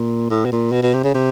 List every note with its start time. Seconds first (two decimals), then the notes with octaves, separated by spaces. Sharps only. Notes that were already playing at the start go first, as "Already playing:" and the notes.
Already playing: A#2
0.30 A2
0.45 B2
0.52 A#2
0.72 B2
0.83 B2
0.94 C3
1.04 C#3
1.15 C3